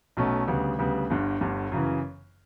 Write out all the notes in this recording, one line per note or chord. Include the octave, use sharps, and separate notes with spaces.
B1 B2 A3 C#4
D2 C#3 G3 B3
D2 C#3 G3 B3
G1 G2 D3
G1 G2 D3
F#2 C#3 E3